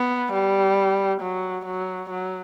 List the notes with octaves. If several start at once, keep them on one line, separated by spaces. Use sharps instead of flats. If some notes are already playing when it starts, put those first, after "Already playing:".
Already playing: B3
G3
F#3
F#3
F#3